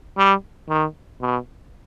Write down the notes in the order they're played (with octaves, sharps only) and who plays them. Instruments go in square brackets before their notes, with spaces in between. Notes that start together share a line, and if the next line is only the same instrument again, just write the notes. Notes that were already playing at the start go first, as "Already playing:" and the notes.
[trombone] G3
D#3
B2